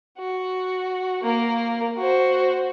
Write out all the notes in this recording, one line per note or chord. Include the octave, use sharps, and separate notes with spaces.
F#4
A#3 A#4
F#4 C5